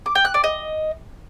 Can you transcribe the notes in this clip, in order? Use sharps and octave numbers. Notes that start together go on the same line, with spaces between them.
D6
G5
F#6
D5
D#5